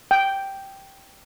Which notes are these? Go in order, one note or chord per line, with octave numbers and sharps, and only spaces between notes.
G5